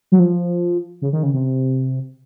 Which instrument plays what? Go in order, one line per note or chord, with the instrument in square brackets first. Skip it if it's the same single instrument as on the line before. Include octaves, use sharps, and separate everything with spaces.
[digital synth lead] F#3
F3
C#3
D#3
C#3
C3